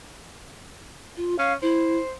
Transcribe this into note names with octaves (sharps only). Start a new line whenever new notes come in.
F4
C#4 F5
E4 C5